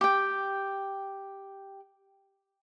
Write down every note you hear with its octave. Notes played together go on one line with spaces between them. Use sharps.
G4 G5